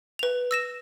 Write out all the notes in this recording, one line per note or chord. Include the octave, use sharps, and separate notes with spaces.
B4 F7
E6 A#6 E7